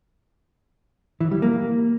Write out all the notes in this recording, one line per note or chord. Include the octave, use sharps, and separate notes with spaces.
E3
G3
A#3